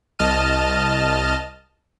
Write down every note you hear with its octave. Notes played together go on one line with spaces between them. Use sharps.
C2 D#5 A5 F6 D#7